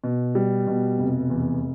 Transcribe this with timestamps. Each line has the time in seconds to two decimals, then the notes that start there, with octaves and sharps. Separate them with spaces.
0.04 B2
0.35 G3
0.67 B2
0.99 F1
1.30 E2